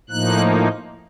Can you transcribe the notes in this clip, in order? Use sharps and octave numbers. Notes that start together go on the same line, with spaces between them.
A2 F3 A#3 D#4 F#6